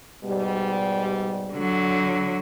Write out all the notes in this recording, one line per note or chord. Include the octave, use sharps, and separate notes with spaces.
G#2 B2 G3
D3 F#3